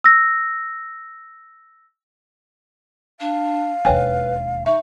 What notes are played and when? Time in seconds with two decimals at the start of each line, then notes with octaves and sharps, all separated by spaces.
0.04 E6 A#6
3.20 D4 F5
3.85 E1 D#2 B4 C#5 G5 G#5
4.66 D#4 E5 C#6